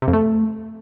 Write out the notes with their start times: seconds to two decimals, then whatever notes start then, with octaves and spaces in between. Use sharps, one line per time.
0.02 C3
0.08 F2
0.13 A3